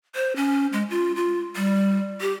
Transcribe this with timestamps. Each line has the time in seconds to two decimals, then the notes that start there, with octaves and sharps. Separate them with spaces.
0.15 C5
0.36 C#4
0.73 G#3
0.90 F4
1.16 F4
1.56 G3
2.21 G4